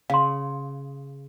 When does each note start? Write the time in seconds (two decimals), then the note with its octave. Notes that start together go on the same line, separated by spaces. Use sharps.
0.10 C#3 F5 C6